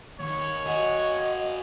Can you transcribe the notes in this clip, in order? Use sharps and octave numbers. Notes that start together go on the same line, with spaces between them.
D#2 C#5
F#4 G#4 D#5